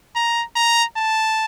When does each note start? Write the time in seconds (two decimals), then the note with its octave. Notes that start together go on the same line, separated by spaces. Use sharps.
0.15 A#5
0.56 A#5
0.96 A5